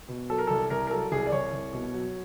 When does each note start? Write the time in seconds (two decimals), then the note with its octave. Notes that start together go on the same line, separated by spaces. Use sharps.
0.08 B2
0.30 F#3 A4
0.38 A#4
0.47 C2 A4
0.70 C2 A#4
0.87 A#4
0.91 F#3 A4
1.12 C2 G#4
1.27 D5
1.32 C2 C#5
1.53 C2
1.73 B2
1.94 F#3